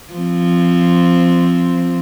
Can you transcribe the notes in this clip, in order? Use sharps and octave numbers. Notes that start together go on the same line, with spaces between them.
F3 C4